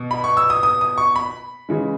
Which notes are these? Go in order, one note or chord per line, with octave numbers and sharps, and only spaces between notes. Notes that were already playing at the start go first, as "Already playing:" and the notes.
Already playing: B2
B5
C#6
E6
D#6
D#6
D#6
C#6
B5
C#3 E3 G#3